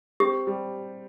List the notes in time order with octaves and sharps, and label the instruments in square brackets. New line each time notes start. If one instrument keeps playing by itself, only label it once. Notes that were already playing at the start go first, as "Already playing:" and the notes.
[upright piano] C4 [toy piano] G4
[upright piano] G3